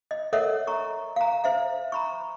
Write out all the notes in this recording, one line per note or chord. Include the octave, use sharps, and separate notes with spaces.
D#5
A4 A#4 C#5 D#5 E5 F#5
A#5 C#6
F5 A#5
C5 E5 F5
A#5 B5 C#6